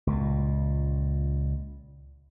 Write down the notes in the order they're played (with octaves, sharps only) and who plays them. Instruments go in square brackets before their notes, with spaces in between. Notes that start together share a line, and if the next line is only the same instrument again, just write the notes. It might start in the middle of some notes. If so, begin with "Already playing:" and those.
[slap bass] C#2 A#2